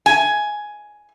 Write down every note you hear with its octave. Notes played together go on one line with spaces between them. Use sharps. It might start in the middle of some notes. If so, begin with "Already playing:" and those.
G#5